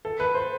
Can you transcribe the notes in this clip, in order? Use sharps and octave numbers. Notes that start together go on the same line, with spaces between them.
A4
B4
C5